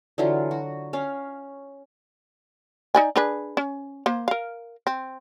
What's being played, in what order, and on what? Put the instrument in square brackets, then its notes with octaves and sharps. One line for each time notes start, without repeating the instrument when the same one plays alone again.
[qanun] D3 E3 F#3 F4
F#4
C#4 F5
[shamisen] D#4 D5 G#5
D4 G#4 B4
C#4
A#3 C5
A#4 F5
C4